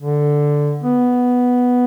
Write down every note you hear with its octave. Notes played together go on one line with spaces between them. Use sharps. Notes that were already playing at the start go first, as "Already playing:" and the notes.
D3
B3